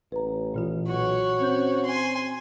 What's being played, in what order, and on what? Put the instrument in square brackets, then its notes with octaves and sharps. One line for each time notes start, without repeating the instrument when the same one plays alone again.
[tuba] A1 [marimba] B4 A#5
[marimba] A#2 E3 F4
[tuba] B1 [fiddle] F#4 C#5
[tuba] C4 [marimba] C#4 G6
[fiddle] G#5 C6